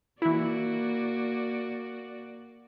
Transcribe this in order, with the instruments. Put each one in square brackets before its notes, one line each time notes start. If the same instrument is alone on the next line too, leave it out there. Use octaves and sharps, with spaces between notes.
[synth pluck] E3 E4 [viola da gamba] A#3 F#4 D5